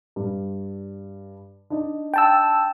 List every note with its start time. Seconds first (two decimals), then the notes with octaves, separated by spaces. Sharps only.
0.16 G2
1.70 D4 D#4
2.14 G5 A5 E6